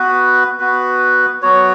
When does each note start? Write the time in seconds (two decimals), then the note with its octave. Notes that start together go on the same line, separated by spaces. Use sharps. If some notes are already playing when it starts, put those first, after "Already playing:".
Already playing: B3 F#4 B4
0.59 B3 F#4 B4
1.42 F#3 B3 F#4 C#5